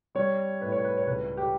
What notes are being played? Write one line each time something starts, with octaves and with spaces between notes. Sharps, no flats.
G3 C#5
A2 B4
C#5
B4
C#5
C#2 B4
G4